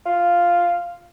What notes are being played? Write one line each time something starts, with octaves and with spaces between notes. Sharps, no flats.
F4